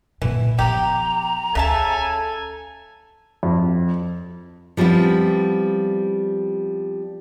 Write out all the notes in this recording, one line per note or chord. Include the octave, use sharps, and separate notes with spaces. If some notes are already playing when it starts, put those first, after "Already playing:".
A#2 D3 E3
F3 B3 G4 A#5
D2 C#3 A4 E5 G#5 A5
F2
F3 G3 B3 C4 E4